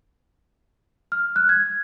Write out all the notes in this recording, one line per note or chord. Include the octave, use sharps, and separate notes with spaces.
F6
F#6
G#6